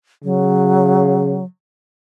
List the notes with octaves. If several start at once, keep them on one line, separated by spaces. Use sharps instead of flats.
C#3 F#3